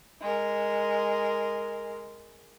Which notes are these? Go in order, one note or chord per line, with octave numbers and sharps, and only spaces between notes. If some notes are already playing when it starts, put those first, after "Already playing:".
G#3 A#4